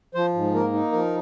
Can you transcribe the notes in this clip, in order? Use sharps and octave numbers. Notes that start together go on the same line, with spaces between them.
F3 C5
G#2
A#3 A#4
D#4
F3 A#4